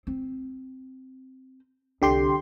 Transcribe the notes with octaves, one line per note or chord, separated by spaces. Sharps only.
C4
C2 D3 G4 C6